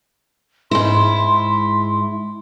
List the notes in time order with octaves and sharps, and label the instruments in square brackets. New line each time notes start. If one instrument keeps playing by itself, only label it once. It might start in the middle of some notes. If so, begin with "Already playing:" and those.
[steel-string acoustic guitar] G#2 E4 [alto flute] C6